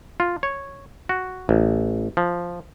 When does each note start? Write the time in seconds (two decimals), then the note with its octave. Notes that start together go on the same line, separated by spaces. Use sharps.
0.20 F4
0.43 C#5
1.09 F#4
1.49 A1
2.17 F3